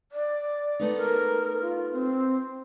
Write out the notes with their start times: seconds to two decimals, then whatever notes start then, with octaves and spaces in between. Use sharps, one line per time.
0.12 D5
0.79 A3 B3 D#4
0.97 A#4
1.62 F4
1.92 C4